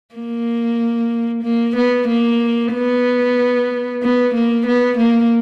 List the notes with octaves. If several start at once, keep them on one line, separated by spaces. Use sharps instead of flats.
A#3
A#3
B3
A#3
B3
B3
A#3
B3
A#3